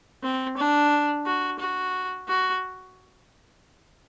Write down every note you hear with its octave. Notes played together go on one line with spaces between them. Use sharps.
C4
D4
F#4
F#4
F#4